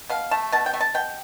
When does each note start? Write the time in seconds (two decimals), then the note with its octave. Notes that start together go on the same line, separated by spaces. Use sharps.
0.10 B2 F5
0.31 A3 A5
0.52 B2 A5
0.66 G5
0.74 A3
0.81 A5
0.94 B2 G5